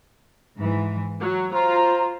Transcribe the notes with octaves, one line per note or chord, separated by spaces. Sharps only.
G#2 E3
F#3
F4 C5 A#5